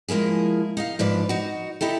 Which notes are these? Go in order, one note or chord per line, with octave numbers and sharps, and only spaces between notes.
F3 G#3 A#3 E4 G#4
D#4 D#5 F5
G#2 F3 D4 B4 D5
D#4 F#4
D#4 E4 G4 A4